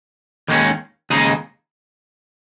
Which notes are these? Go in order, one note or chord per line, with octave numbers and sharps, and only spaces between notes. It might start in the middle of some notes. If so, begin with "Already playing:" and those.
D#2 D#3 G#3 C#4
D#2 C#3 G#3 D#4 G#4